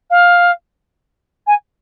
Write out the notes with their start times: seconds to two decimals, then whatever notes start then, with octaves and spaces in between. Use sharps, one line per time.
0.10 F5
1.47 G#5